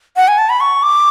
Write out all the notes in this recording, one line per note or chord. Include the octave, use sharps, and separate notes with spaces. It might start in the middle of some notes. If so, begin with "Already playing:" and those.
F#5
G#5
A5
B5
C#6
D6